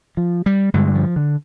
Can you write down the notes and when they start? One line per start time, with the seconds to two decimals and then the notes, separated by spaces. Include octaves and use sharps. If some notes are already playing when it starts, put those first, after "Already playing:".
0.17 F3
0.46 G3
0.74 G2 D3 G#3
0.95 F3
1.16 D3